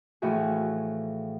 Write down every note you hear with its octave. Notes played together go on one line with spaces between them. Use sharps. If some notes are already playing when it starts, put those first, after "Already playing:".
A2 E3 F3 F#4 G#4